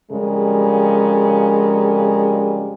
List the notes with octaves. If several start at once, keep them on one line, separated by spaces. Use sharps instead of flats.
F2 C#3 G3 G#3 A#4